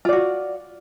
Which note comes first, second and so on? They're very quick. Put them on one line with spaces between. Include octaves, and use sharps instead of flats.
F4 D5 F#4